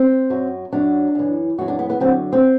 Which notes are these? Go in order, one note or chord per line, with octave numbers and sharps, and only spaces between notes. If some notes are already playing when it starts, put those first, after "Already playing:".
Already playing: C4
F#2 F#3
F#2 F#3 D4
F#2 E3
F#2 E3 F#4
D4
B3
B3
F#2 D3 F#3 C4
C4